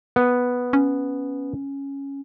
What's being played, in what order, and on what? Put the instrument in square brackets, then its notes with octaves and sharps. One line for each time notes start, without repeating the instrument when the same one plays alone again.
[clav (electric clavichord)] B3
[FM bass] C#4